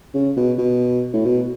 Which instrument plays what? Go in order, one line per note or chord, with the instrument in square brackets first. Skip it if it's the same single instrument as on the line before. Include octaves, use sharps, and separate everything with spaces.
[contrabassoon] C#3
B2
B2
A2
B2